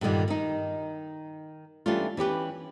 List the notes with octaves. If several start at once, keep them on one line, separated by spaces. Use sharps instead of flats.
G2 A#2 D3 D#3 G3
D#3 D#4
E3 G3 A3 C#4 D4 F4
E3 C#4 G4 B4